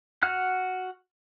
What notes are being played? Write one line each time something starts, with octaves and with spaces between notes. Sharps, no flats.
F#4 F#5 F6 F#6